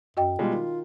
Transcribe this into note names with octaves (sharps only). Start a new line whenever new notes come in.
F#2 F#4 D#5 G5
B2 G3 G#3 F4
D#3